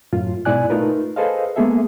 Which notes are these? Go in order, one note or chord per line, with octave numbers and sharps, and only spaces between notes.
F#2 A2 F4
G#2 B2 E4 D5 G#5 F#6
A3 D#4 F4 A#4 B4
G#4 A4 B4 C5 D#5 F5
G#3 A#3 B3 G#4 A4 E5